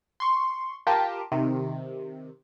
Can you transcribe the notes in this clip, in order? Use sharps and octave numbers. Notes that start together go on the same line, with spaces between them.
C6 C#6
F4 G4 A#4 G5 A5
C3 D#3